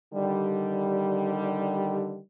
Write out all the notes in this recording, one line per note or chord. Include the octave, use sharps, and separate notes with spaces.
D3 D#3 G3